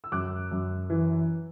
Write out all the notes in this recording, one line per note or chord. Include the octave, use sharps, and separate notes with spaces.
E6
F#2 D6 F#6
F#2
E3